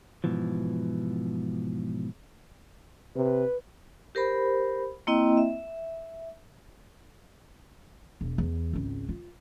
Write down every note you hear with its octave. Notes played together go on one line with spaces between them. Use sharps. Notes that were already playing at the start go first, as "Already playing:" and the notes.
G#2 B2 E3 F3
C3 B4
G4 A#4 C5 B5
A#3 C4 E4 D#5 G5
E5
E1
E2
G#1 C#2
F4